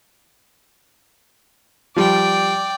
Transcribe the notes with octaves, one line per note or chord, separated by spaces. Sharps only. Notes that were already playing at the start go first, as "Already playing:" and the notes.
F3 G3 D5 G5